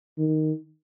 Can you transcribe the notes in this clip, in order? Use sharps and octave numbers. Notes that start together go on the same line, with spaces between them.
D#3